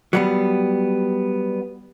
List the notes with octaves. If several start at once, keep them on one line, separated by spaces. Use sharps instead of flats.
F#3 G3 B3